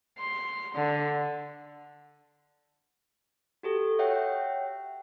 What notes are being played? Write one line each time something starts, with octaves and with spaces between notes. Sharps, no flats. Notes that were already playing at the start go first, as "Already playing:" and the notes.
C6
D3
F#4 G4 A4
C#5 E5 F#5 G5